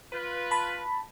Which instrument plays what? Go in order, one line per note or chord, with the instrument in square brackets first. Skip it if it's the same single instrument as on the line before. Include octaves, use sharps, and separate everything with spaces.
[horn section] F4 B4
[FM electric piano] A5 B5